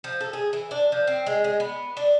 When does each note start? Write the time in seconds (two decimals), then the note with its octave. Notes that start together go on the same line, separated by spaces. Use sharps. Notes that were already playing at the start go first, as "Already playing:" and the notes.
0.04 F3
0.21 A4
0.33 G#4
0.53 E3
0.71 D4
0.92 F3
1.07 C4
1.26 G#3
1.44 G#3
1.60 B3
1.97 D4